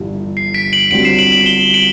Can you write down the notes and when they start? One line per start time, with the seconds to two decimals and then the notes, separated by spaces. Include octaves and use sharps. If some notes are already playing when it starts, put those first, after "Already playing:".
Already playing: G1 G2 E3
0.37 C7
0.54 B6 D7
0.73 D7 F#7
0.91 G1 G2 F#3 C4 D7 F#7
1.05 C7 E7
1.19 D7 F#7
1.32 D7 F#7
1.46 E7 G7
1.74 D7 F#7